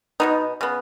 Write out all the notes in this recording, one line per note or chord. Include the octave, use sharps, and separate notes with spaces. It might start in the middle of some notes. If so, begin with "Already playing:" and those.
B2 F#3 B3 D#4
C#3 B3